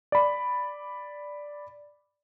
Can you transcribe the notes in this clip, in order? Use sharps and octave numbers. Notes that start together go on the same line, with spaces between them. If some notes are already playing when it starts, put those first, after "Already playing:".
D5 B5